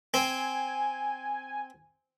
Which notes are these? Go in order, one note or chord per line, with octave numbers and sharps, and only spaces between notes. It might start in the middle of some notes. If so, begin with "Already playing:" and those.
C4 G#5